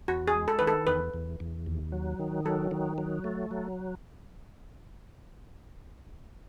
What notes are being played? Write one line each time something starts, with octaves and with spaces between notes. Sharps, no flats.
E2 F#4
G#4
G#3
A4
D#3 B4
A4
E2 B4
E2
E2
D#2
F#3
D#3
F#3 A4
D#3
F#3
A3
F#3